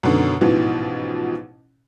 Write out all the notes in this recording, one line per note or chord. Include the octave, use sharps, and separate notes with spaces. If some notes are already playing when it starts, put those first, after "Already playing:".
F#2 B2 D3 D#3
A1 G#2 B2 E3 F3